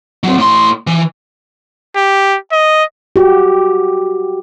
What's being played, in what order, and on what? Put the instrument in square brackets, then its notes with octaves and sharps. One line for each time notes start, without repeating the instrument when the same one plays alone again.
[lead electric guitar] F#3 C4
A2 C6
E3
[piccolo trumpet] G4
D#5
[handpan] F#4 G4